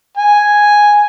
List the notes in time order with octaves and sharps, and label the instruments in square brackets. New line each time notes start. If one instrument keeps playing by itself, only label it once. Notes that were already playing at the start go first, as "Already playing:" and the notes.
[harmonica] G#5